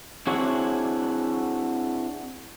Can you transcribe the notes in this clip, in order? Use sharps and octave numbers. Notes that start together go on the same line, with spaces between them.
C4 D4 E4 F#4 G#4 C#5